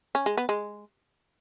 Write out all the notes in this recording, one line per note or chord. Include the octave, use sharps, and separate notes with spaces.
C#4
G#3
B3
G#3